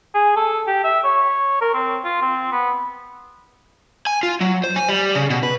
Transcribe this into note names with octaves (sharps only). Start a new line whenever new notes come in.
G#4
A4
G4
E5
C#5
A#4
C4
F4
C4
B3
G#5
F4
F#3
C5
G#5
G3
C#3
B2
B4